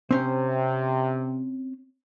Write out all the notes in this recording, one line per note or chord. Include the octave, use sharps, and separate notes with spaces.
C3 C4 C#4 C5